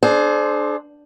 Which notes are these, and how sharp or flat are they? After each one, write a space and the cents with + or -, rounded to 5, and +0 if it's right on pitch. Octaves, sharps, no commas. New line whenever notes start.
D4 +15 G#4 +40 C5 +0